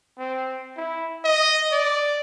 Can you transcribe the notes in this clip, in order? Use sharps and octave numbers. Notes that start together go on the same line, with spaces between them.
C4
E4
D#5
D5